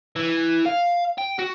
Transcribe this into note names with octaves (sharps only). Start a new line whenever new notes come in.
E3
F5
G5
F#4